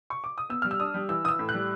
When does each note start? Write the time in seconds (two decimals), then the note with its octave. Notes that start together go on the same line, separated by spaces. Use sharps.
0.10 C#6
0.24 D6
0.38 D#6
0.49 B3 E6
0.62 G3 F6
0.71 E6
0.80 D4 D#6
0.94 G3
1.09 E3 E6
1.24 E3 D#6
1.28 E6
1.39 A2
1.49 F#6
1.54 G3